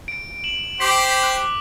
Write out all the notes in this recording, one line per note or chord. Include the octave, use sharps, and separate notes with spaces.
D7
E7 F#7
G4 C5 D6 B6
B6
F#6